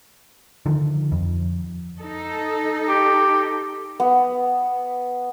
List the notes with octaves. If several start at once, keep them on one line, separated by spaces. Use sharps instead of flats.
D3 D#3 F3
F2
D#4 A4
G4
B3